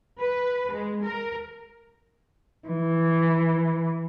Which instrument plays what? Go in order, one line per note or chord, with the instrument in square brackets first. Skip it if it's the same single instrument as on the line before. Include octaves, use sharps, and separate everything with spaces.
[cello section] B4
G#3
A#4
[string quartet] E3